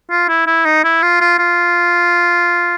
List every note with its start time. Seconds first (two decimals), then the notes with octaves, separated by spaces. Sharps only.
0.10 F4
0.29 E4
0.47 E4
0.65 D#4
0.84 E4
1.03 F4
1.21 F4
1.39 F4